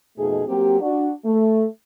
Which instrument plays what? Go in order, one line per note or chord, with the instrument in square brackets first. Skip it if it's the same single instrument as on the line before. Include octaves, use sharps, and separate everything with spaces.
[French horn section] F2 B2 A3 D#4 G#4
F#3 A#3 C4 G4
D4 F#4
A3